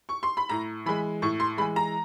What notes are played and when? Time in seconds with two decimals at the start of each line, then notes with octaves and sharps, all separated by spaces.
0.09 C#6
0.23 C6
0.37 B5
0.49 A2 A#5
0.86 E3 G#3 B5
1.22 A2 C#6
1.40 C6
1.57 E3 G#3 B5
1.76 A#5